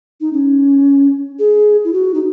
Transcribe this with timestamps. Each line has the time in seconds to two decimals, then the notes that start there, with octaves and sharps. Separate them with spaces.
0.21 D#4
0.33 C#4
1.39 G#4
1.85 E4
1.93 F#4
2.14 D#4